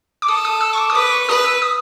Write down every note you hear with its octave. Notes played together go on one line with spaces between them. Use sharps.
D6
A4 D#6
D#6
E6
C#6
D6
D#6
B4 D6
D6
C#6
B4 D#6
E6
D#6